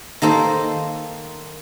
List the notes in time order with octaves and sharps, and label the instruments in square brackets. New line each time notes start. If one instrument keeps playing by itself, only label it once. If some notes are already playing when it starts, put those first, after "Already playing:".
[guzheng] D#3 A#3 A4 C5